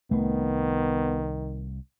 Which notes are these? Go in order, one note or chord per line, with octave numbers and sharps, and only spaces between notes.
C2 A2 D#3 A3 B3